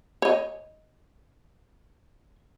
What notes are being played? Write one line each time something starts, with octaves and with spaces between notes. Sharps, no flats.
C#5 D#5